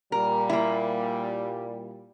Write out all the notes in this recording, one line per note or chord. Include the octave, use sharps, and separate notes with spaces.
A#2 G3 A#4
A#3 E4